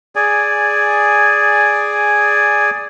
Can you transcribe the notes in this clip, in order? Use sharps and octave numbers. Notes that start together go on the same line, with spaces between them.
G#4 D5 G#5